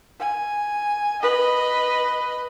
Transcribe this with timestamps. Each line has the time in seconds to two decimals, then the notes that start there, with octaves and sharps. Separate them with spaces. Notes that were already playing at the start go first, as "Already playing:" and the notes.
0.20 G#5
1.22 B4 D#5